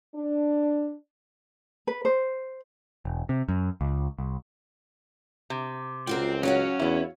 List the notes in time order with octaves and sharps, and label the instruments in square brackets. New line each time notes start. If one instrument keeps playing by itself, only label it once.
[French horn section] D4
[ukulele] B4
C5
[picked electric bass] E1
C3
F#2
C#2
C2
[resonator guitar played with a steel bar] C3
[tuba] C#2 [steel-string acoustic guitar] F4 F#4 A#4 [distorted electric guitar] C5 G5
[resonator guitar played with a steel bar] F#3 [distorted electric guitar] C#4 [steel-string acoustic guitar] F#4 C#5 F5
[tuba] E2 [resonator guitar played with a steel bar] B3 E4